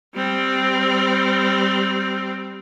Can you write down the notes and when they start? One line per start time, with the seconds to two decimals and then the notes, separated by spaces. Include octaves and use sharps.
0.15 G3 C4